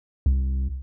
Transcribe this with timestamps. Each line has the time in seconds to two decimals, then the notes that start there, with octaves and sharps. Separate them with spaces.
0.26 C2